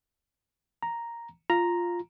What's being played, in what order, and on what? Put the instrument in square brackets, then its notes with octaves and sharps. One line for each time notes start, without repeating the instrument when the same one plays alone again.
[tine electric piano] A#5
[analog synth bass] F4 [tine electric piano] A#5